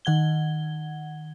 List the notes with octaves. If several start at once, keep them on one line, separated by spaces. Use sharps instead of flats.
D#3 F#5 G#6 G7